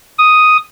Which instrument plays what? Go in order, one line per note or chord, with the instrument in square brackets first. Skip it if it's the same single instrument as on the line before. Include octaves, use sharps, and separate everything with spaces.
[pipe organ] D#6